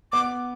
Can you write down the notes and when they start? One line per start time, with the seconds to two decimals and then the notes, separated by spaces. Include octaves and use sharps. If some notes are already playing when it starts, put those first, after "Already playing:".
0.12 B3 D6